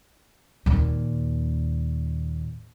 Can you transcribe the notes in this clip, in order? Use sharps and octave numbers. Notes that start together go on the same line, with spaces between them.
D#2 A#2